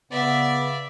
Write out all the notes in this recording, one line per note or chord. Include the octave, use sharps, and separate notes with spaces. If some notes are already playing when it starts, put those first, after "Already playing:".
C#3 B3 D5 E5